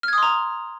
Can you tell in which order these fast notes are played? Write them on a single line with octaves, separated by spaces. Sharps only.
F6 G#6 D#6 C6 A#5